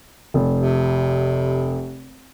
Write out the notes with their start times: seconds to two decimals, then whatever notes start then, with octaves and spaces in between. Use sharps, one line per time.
0.34 F1
0.60 C3